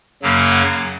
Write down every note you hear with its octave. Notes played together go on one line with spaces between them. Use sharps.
F#2 C#3 F#3 A#3
F#5